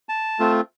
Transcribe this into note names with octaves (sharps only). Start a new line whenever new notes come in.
A5
A3 C4 F4